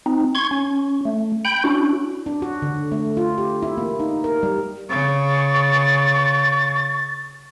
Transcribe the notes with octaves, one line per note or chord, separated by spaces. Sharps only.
C4 D#4
C6 C#6 G#6
C#4
A3
G5 B5 G6
C#4 D4 E4 F#4
D4
F#4
D3
A3
F4
G4
E4
A#3
D#4
A#4
G3
C#3 C#6 A6